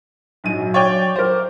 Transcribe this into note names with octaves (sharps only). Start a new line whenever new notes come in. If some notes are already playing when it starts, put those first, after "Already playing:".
A#1 G#2 F#3 D#7
C#5 D5 G5
A#4 C5 D6